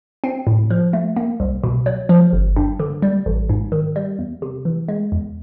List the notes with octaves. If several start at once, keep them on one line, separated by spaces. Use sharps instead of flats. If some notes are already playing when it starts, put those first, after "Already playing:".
C4
A2
F3
A3
A#3
C2
B2
F#3
F3
G1
G2
D3
G3
A1
G#2
D#3
G3
E2
C3
E3
G#3
E2